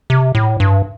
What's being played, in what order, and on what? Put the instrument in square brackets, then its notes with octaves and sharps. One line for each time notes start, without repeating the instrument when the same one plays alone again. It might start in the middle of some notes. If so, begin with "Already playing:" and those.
[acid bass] C3
A2
G2